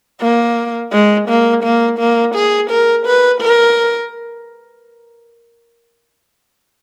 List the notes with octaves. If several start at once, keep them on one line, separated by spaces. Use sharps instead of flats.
A#3
G#3
A#3
A#3
A#3
G#4
A#4
B4
A#4